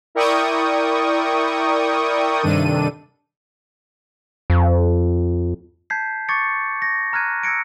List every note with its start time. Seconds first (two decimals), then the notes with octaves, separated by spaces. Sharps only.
0.15 E4 A#4 D5 G5 C#6 D#6
2.42 G2 C3 D#3 D4 A4 D#7
4.50 F2
5.90 A5 G6 G#6 B6 C7
6.29 C#6 D6 G#6 A6 C#7
6.82 A#6
7.13 A#5 F6 F#6 G#6 D#7
7.43 E6 G#6 A#6 C#7 D7